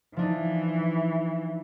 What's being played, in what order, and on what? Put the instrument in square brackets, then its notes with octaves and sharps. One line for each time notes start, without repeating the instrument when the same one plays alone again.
[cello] E3 [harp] F3 D4 D#4